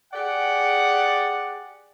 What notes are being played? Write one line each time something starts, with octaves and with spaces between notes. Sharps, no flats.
G4 G#4 D5 F#5